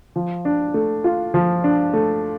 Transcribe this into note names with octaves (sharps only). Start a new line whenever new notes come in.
F3
D4
A3
F4
F3
D4
A3